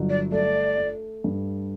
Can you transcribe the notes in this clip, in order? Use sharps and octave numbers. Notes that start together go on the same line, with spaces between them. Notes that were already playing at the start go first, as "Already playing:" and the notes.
Already playing: G1 F#3
D5
A3 D5
A3
G2